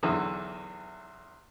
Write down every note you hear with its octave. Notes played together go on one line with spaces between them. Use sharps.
B1 E2 D3 E3